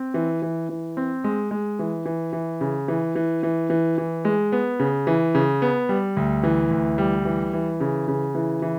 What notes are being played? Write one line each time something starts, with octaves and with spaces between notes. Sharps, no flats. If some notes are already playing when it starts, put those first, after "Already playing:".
Already playing: C4
E3
E3
E3
C4
G#3
G#3
E3
E3
E3
C#3
E3
E3
E3
E3
E3
G#3
B3
C#3
E3
C#3
B3
G3
D2
E3
D2
G3
E3
E3
C#3
C#3
E3
E3